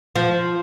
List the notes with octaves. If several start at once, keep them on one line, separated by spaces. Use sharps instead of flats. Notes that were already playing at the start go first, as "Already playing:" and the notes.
F3